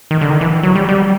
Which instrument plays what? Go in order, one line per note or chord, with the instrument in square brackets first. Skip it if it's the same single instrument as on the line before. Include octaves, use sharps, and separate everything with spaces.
[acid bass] D#3
D3
D#3
E3
F#3
G3
G3